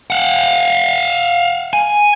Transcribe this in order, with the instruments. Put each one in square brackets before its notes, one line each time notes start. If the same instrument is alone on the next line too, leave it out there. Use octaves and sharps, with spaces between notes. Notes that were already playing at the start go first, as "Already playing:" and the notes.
[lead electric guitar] F5 F#5
G#5